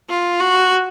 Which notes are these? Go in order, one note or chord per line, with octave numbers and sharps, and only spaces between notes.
F4
F#4